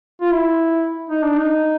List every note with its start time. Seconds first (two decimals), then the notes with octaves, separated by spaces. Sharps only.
0.21 F4
0.31 E4
1.10 D#4
1.23 D4
1.38 D#4